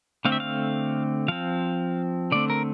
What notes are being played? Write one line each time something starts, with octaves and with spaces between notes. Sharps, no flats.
D3 A3 C4 F5
E5
F5
F3 C4 F5
D3 A3 C4 D5
A#4